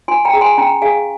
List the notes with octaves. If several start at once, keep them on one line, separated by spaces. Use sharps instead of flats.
F4 G#5 C6
G5 A#5
G#4
G#5 C6
C#4 G5 A#5
G#4 F5 G#5